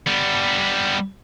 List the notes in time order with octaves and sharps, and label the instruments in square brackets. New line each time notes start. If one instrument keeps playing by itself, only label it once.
[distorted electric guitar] G3 B3